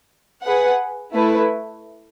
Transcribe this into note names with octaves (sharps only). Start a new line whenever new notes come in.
G#4 B4 F#5
A3 E4 B4